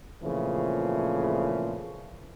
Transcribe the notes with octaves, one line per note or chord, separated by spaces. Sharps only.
A#2 C#3 E3 F3 A3 C4